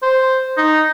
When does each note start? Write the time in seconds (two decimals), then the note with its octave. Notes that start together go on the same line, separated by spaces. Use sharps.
0.02 C5
0.57 D#4